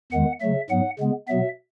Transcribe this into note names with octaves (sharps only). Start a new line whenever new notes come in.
E2 D#3 G#3 F#5
C#3 F#3 A3 E5
G#2 F#3 B3 F#5
C#3 G#3 B3
B2 F#3 B3 E5